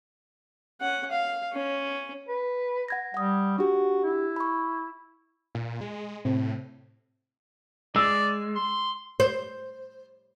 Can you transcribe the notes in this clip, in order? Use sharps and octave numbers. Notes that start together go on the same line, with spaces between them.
C#4 F#5
F5
C#4
B4
F#5 G#6 A#6
G3 F#5 D#6
D4 F#4 G4
E4
B5 C#6
A#2
G#3
A2 C3 C4
G#3 D5 E6
C6
C5